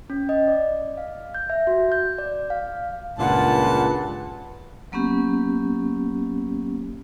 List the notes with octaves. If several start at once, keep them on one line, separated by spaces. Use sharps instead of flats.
C#4
D#5
D5
F5
G6
E5
F#4
G6
D5
F5
C#2 G2 A#2 F4 B4 F#5 A5
F#3 A#3 B3 C#4 G4